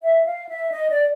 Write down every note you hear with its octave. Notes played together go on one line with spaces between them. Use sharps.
E5
F5
E5
D#5
D5